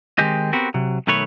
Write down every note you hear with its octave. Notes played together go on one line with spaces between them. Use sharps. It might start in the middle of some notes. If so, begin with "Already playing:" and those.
D#3 G#3 C4 G4 D#5
B3 C4 F#4 G4 A#4
C3 F#3
B1 D#3 A3 B4 C#5